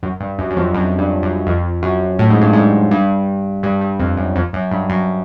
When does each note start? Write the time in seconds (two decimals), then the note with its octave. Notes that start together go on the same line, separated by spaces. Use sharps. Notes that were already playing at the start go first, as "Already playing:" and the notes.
0.03 F#2
0.21 G2
0.39 F#2
0.51 F#2
0.57 F2
0.75 F#2
0.99 G2
1.23 F#2
1.47 F2
1.83 F#2
2.19 A2
2.30 G#2
2.41 G2
2.53 G#2
2.91 G2
3.63 G2
3.81 G2
3.99 F2
4.17 F#2
4.36 F2
4.53 F#2
4.71 G2
4.89 F#2